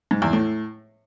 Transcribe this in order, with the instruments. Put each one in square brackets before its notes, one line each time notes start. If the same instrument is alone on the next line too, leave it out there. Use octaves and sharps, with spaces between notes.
[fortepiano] G#2
E2
A2